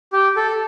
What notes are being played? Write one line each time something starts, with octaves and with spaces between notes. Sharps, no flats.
G4
A4